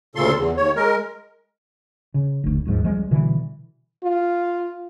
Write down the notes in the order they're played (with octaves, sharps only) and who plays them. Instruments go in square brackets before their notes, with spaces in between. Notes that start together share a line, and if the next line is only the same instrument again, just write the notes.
[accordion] D2 A#2 C#3 A4 C6
E2
D#2 C#5
G#3 A#4
[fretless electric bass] C#3
F1 D2
D#1 D#2 G#2 F3
C#2 F3 G3 G#3
B2 D3 E3 G3
[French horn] F4